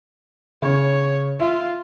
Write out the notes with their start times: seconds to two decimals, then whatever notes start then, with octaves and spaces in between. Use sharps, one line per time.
0.62 C#3 C#5
1.40 F4 E5